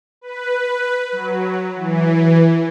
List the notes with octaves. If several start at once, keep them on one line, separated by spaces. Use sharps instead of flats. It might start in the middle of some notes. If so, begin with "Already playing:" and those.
B4
F#3
E3